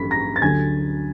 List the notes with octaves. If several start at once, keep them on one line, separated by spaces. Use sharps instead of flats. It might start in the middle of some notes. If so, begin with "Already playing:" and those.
Already playing: A1 G2 D#3 F#3 B5 B6
A#5 A#6
A6
D2 D3 F#3 G#5 G#6